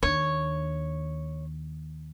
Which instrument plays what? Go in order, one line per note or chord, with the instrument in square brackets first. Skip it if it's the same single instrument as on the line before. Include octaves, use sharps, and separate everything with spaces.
[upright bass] D#2 D4 [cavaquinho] C#5